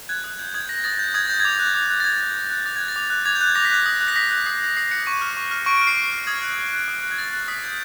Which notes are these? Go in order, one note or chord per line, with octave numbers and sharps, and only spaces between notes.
F#6 G#6
D#6
G6
D#6 G#6
G6 A#6
D#6 A6
G6
D#6 G#6
G6 A6
D6 G#6
F#6
D6
F#6
A6
D6 G#6
F#6
D6
F#6
D6 A6
F#6 G#6
A6
D6
F#6
D6 G#6
G6
F#6
G#6
D6 A#6
B6
F#6 A#6
D#6
F#6
A#6
D#6 B6
F#6
D#6 C7
F#6
D#6 C7
F#6 C#7
C#6 D#7
F6
C#6
F6
C#6 D7
F6 D7
C7
C#6
F6
D#6 G#6
F#6
D#6
F#6
D#6
F#6
G#6
D#6 A6
F#6
D#6 B6
G6